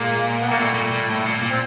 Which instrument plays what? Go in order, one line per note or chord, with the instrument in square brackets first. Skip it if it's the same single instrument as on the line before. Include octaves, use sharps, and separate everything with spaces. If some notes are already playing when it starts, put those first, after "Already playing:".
Already playing: [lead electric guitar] A#2 [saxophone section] G#3 A#3
[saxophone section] B3
[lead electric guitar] B2 [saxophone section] A#3
[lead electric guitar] A#2 [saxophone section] G3 A3
[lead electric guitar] A#2
A#2
A2
A#2
A#2
[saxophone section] C4